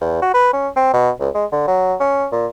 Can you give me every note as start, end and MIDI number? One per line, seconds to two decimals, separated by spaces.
0.01 0.21 40
0.22 0.33 66
0.34 0.51 71
0.53 0.68 61
0.76 0.92 60
0.93 1.10 47
1.19 1.29 37
1.35 1.45 56
1.52 1.67 50
1.67 1.95 54
2.00 2.26 61
2.32 2.47 46